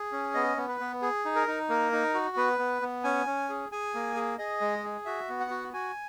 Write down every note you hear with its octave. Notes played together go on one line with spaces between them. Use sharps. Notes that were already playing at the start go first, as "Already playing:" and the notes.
Already playing: G#4
C#4
B3 D#5
B3
B4
B3
G#4
D#4
A#4
D#4
A#3 A#4
D#4
F#4
B3 B4
B3
B3
C#4 G#5
C#4
G#4
G#4 G#5
A#3
G#4
G#4 D#5
G#3
G#4
F#4 E5
B3
F#5
F#4
F#4 G#5